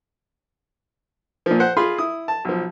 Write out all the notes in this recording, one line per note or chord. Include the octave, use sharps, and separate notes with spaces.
A#2 F3
C5 F#5
F4 G#4 B5 C6
E4 D#6
A5
B1 F3